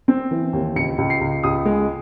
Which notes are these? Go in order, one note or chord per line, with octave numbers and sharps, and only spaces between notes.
C4
E3
D#2
C#2 C#7
C#2
C7
C#2
C#2 D#6
G#3